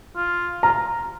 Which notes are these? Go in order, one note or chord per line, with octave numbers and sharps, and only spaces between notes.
F4
F4 A#5